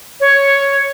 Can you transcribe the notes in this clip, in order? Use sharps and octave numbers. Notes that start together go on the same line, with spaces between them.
C#5